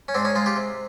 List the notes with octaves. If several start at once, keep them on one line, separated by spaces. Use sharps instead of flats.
C#4
G#2 C4 D4
C#4 D#4
G#3 D#4 F4
F4 G4
C3